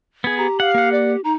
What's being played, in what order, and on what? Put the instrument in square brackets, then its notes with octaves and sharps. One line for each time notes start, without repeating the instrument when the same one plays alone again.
[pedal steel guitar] B3 G#4 [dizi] G#6
[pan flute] G4 [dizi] A#5
[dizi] F5 [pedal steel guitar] F#5
[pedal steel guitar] A#3 F#5
[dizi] D5
[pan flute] D#4 [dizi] A#5